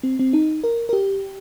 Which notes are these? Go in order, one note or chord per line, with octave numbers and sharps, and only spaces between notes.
C4
C4
D#4
A#4
A#4
G4